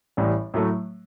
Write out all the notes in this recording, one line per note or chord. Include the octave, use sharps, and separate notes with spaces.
A1 A2 G3
A2 F#3 A3